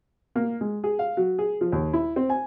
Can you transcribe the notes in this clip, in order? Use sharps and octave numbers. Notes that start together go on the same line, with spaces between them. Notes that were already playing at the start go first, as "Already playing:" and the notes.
A#3
G#3
G#4
F5
F#3
G#4
F3
D#2
E4
C4
G#5